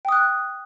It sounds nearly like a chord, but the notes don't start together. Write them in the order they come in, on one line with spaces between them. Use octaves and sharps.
G5 D#6 F#6